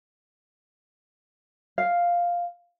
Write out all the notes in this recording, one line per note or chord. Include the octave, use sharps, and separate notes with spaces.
F5